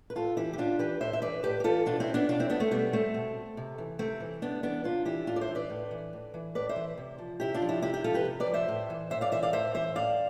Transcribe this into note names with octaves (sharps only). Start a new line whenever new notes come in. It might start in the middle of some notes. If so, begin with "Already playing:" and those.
B4
A2 F4 A4
E3 E4 G4
G4
A2 D4 F4
E3 G4 B4
A2 C5 E5
E5
E3 B4 D5
A2 G4 B4
G4
E3 F4 A4
B2 D4 F4
C4 E4
B3 D4
B2 D4 F4
C4 E4
B3 D4
A3 C4
B2 G3 B3
A3 C4
B2
C3
E3
C3 A3 C4
E3
C3 B3 D4
E3 B3 D4
C3 D4 F4
E3 E4 G4
A2 D4 F4
D5
C5 E5
E3
B4 D5
A2
E3
A2
E3
A2 B4 D5
C5 E5
E3
C3
F3
C3 E4 G4
D4 F4
F3
E4 G4
C3 E4 G4
E4 G4
F3 F4 A4
G4 B4
C3
B4 D5
F3
C5 E5
A2
E3
A2 C5 E5
D5 F5
E3 C5 E5
D5 F5
A2 C5 E5
E3 C5 E5
A2 D5 F5